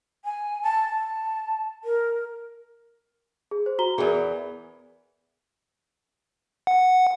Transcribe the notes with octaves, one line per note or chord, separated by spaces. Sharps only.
G#5
A5
A5
A#4
G#4
C5
F#4 A#5 G7
E2 E3 G#4 A#4
F#5